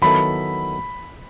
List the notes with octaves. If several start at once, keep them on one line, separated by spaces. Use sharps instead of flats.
D#3 F#3 B3 E4 A4 B5